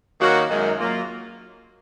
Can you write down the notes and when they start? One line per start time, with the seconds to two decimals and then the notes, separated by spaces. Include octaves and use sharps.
0.20 D#3 A#3 C#4 F#4
0.49 F#2 D#3 G#3 D#4
0.78 F#3 A#3 F4